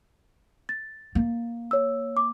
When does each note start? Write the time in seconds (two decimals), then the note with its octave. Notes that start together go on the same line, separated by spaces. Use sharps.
0.69 A6
1.15 A#3
1.71 C#5 E6
2.17 D6